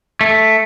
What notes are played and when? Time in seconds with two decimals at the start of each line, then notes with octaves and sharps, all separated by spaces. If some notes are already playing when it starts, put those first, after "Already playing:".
0.21 A3